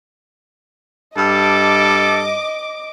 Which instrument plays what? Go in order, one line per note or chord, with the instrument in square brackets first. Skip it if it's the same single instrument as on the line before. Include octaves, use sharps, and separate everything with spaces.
[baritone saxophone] G2 [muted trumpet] A4 [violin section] D#5 D6